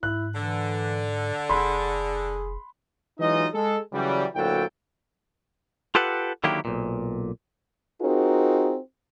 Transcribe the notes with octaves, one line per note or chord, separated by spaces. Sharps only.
G#2 E4 F#6
D3 E3
F1 G#4 B5 C6
E3 F#3 G#3 D#4 F4 D#5
G#3 A4
C#3 E3 F#3 G3
D2 A#2 F#3 E4 A4 G5
F4 G4 A4 B4 F#5
D3 D#3 F#3 A#3 E4 G4
B1 A#2
C4 D#4 F4 F#4 G#4 A#4